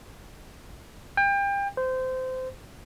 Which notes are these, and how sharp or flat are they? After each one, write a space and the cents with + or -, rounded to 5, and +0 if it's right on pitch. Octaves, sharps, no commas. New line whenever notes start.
G5 +30
C5 -20